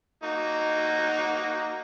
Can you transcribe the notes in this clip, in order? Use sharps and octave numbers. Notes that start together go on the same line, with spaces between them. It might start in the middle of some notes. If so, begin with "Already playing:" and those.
A#3 D#4 F#4